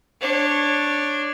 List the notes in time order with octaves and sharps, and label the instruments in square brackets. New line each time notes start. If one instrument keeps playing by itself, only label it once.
[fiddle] D4 C#5